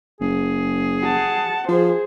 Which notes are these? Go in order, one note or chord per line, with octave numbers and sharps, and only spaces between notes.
F#1 G#4
F#5 A5
F3 G#4 C5